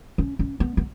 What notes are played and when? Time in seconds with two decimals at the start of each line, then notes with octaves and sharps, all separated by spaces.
0.18 C#4
0.39 C#4
0.60 B3
0.77 B3